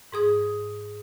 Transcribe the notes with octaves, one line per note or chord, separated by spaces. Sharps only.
G#2 G#4 D#6